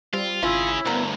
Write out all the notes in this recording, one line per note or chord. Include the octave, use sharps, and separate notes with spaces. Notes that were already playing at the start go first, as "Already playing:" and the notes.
G3 C4 F4
G#1 C#4 E4 F4 G#4
D2 G2 B3 C4 A#4